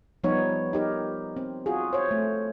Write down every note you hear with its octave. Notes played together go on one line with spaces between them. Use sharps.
F3 G3 B3 D#4 C#5
D#4 G4 A#4
C4
F4 F#4 G#4
C5 C#5
A3